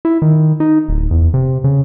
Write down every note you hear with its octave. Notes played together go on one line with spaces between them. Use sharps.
E4
D#3
D#4
D1
E2
C3
C#3